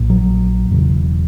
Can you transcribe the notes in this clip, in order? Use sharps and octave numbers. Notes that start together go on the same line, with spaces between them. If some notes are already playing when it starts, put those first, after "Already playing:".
Already playing: A#1 A#2
F#3
E1 E2 C#3